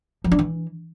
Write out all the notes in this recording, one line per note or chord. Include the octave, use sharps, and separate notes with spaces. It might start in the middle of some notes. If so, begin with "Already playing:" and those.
F3
D4
E3